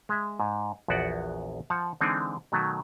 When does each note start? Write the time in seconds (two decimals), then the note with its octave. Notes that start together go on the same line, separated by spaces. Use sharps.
0.09 G#3 E5
0.40 G#2
0.88 A#1 E2 B3 F#4 D5 F#5
1.70 F3 F#5 A5
2.01 D3 E3 G#3 C4 D4 D#4
2.52 B2 D#3 F#3 A3